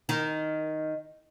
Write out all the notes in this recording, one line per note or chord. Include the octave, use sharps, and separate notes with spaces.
D#3